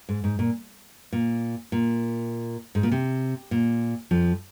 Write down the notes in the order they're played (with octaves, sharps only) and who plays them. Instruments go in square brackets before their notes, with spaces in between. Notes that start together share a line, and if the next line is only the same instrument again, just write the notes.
[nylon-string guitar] G#2
G#2
A#2
A#2
A#2
G#2
A#2
C3
A#2
F2 F3